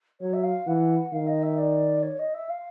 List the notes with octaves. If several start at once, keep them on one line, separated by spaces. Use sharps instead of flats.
F#3 C#5
E5
F5
E3 F#5
D#3 F5
D#5
E5
D5
C#5
D#5
E5
F5